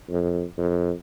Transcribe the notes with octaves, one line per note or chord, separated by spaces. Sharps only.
F2
F2